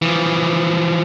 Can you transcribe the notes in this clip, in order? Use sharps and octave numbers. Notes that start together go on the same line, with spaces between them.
E3 F3